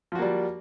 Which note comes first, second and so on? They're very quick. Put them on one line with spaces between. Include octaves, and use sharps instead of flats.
F3 F#4 A#3 G3